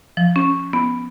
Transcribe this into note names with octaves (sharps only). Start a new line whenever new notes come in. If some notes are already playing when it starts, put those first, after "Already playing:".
F3
C#4
B3